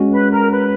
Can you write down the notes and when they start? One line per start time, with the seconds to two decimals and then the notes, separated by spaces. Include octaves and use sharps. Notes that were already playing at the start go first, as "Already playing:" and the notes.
Already playing: G#3 C#4 F#4
0.11 B4
0.31 A#4
0.51 B4